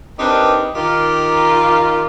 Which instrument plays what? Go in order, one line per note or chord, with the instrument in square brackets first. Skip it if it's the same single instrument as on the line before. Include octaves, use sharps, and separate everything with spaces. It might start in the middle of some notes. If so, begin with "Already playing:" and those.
[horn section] C4 D4 D#4 G4 A#4 B4
D#3 D#4 F4 G4 A#4